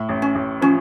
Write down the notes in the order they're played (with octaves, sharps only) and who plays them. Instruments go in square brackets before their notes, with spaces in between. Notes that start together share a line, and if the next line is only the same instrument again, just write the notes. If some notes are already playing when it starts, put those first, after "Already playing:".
Already playing: [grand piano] A2
A1
[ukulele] C#4
[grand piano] A1
[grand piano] F3 [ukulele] C#4